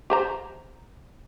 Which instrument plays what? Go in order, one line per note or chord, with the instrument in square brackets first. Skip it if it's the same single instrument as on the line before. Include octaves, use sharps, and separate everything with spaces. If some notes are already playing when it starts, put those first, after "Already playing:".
[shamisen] G4 C5 A#5